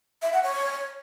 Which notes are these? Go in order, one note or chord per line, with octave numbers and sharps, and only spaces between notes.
E5
F#5
C#5